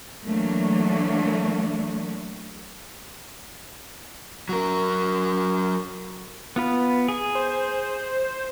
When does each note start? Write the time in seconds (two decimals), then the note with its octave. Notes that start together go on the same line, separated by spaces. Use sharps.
0.24 E3 F#3 A3 A#3 D4
4.49 F#3 A#4
6.56 B3 F4 B4
7.08 G#4 G#5
7.35 C5